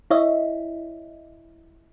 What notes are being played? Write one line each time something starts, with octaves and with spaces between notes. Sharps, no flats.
E4 C#5 D#5 E5